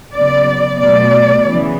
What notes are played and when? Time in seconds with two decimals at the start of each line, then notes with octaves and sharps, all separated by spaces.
0.15 C#3 F#3 B3 D5
0.80 B2 F#3 A3 D5
1.45 C#3 E3 B3